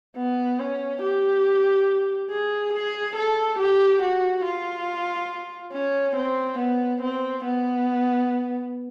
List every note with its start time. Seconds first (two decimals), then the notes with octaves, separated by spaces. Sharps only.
0.17 B3
0.59 C#4
1.02 G4
2.30 G#4
2.73 G#4
3.16 A4
3.59 G4
4.02 F#4
4.45 F4
5.73 C#4
6.16 C4
6.58 B3
7.01 C4
7.44 B3